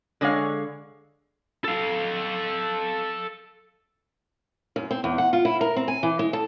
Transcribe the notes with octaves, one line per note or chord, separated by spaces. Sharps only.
D3 G#3 C#5 F5
A4 F5
F#2
C4
E2
F#5
F4
E4
A#4
C4
G#5
E3
G#3
A4